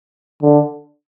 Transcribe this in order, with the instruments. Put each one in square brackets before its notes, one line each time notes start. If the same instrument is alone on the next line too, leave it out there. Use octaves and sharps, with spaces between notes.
[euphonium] D3